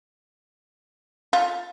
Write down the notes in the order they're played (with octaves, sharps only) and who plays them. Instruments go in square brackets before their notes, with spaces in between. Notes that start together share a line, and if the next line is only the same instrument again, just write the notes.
[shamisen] F4